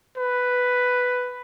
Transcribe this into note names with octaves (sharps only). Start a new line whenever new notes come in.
B4